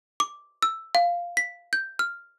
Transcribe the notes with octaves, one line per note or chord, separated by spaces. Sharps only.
D6
E6
F5
B6
G6
F6